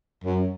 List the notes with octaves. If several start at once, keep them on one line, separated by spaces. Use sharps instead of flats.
F#2